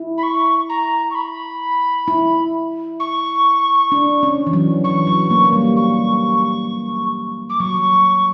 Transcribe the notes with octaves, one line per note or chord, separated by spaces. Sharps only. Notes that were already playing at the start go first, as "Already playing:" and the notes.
Already playing: E4
B5
C#6
A#5
C#6
B5
E4
C#6
D4
C#4
E3
F#3
E3 C#6
F#3
A#3
A#3
G3
C#6
D6
F#3 C#6